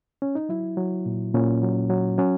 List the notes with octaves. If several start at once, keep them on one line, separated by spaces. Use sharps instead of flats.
C#4
D#4
F#3 E4
F#3
A#2
A#2 C#4
F#3
F#3
F#3 C#4